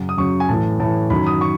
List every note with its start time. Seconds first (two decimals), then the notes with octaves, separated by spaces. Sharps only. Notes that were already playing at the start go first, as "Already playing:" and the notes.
Already playing: F#2 C#3 F#3
0.09 D#6
0.17 F#2 C#3 F#3 C#6
0.40 G#5
0.49 A2 E3 A5
0.80 A2 E3 A5
1.10 F#2 D#3 F#3 B5
1.27 D#6
1.41 C#6